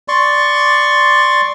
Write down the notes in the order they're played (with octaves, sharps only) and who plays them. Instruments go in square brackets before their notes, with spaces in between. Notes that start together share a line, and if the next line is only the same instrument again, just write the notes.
[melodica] D5 C6 C#6